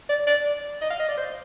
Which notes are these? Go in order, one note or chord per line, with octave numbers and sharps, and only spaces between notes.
D5
D5
D#5
F5
D#5
D5
C5